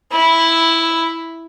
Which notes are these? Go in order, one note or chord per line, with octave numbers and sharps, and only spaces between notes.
E4